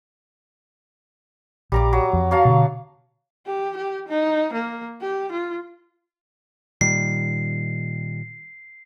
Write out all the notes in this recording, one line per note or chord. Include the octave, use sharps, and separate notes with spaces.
A#1 G3 A#5 D6
F#3
F2
F#3 F5 A5
B2 D3
G4
G4
D#4
A#3
G4
F4
A#2 D#3 G3 C7